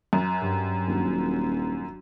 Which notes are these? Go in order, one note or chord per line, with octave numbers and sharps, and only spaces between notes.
F#2 F#6 A6
G2 F#3
D#1 D4 F#4